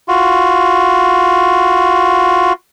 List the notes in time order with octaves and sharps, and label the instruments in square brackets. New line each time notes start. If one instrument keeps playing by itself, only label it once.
[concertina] F4 F#4